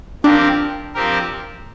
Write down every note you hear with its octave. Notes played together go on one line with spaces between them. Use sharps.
F3 C4 D4 G4 A#4
F3 C4 G4 A#4